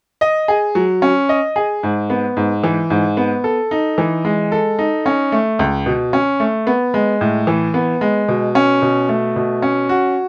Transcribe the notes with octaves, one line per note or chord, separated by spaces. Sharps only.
D#5
G#4
F#3
C#4
D#5
G#4
G#2
B3
G#2
E3
G#2
B3
A4
D#4
E3
G#3
A4
D#4
C#4
A3
C#2
B2
C#4
A3
B3
G#3
A2
E3
B3
G#3
B2
C#4
B2
A3
B2
C#4
F#4